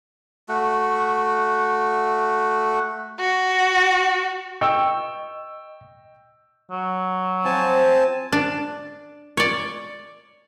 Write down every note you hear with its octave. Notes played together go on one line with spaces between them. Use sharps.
A3 F#4
F#4
D#5 G5 C#6 E6
F#3
F3 C4 F5 G#5 A5
D4
C#5 D5